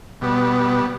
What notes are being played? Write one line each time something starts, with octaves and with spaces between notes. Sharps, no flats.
B2 G3 B3